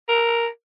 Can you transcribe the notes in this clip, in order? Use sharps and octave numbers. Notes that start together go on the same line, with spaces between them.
A#4